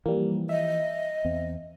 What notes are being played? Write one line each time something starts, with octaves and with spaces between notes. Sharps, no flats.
E3 F3 G3 A#3
D#5 E5
E2 C4